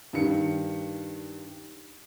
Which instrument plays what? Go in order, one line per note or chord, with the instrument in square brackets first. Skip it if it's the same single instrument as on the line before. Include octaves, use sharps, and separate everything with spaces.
[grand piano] G2 D#3 C#7